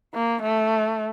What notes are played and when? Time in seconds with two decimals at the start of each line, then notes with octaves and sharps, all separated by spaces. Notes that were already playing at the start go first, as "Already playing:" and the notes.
0.14 A#3
0.43 A3